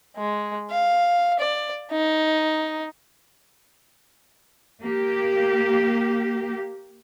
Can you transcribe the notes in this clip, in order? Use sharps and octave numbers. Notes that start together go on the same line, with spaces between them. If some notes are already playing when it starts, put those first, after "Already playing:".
G#3
F5
D5
D#4
A#3 G4